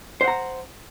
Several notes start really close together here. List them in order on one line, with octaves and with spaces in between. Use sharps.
C5 F#5 A#5